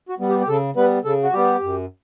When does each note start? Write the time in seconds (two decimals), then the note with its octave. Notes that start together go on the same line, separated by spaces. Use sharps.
0.09 F#4
0.19 G3 B3
0.29 G4
0.41 G4
0.48 C#3 A4
0.76 G3 B3 B4
1.04 C#3 A4
1.23 F#4
1.33 G3 B3 G4
1.63 F#2